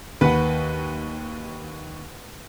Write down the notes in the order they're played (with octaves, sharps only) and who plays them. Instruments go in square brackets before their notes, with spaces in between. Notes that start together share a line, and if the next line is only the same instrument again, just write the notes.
[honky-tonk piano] D#2 [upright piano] B4 F#5